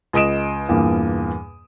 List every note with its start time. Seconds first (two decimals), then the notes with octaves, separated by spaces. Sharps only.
0.13 C#2 D#5 D#6 D7 E7
0.69 E2 G2 A#2 A#3